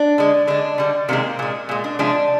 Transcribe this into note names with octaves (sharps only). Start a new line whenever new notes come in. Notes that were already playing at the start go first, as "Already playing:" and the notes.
Already playing: D4
D3 G#3
D3 G#3 D4
D3 G3
C3 D#3 G#3 A#3
A#2 G#3
A#2 G#3
D4
C3 F3 G#3 D4